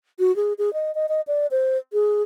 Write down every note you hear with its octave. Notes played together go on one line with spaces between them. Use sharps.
F#4
G#4
G#4
D#5
D#5
D#5
D5
C5
G#4